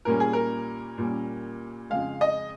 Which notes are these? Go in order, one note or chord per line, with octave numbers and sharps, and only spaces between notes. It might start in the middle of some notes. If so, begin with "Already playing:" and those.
A#2 G3 A#3 C#4 A#4
G#4
A#4
A#2 G3 A#3 C#4
F2 C#3 G#3 F5
D#5